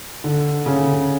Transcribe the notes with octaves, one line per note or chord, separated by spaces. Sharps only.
D3
C#3
D3
C#3